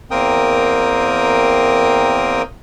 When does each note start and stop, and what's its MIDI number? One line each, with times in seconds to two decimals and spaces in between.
0.11 2.42 40
0.11 2.42 58
0.11 2.42 60
0.11 2.42 70
0.11 2.42 79
0.11 2.42 87